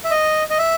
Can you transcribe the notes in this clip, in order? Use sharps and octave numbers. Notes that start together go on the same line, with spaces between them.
E5
D#5
D#5
E5